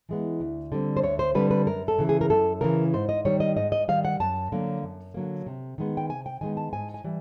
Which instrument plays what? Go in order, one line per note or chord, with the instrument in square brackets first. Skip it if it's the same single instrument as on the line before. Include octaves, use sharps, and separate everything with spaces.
[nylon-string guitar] E3 G#3 B3
D2
D3 G3 C4
C5
D2 C#5
C5
D3 G3 C4 B4
B4
F#2 A#4
A4
C#3 E3
G#4
A#4
F#2 A4
C#3 E3 A#4
G#2 C5
D#5
D#3 G3 C#5
D#5
G#2 D#5
D#5
D#3 G3 F5
F#5
F#2 A5
D3 F#3 A#3
F#2
D3 F#3 A#3
C3
D#3 G#3 B3
G5
C3 G#5
G5
D#3 G#3 B3 G#5
A5
G#2 G#5
G#5
E3 G3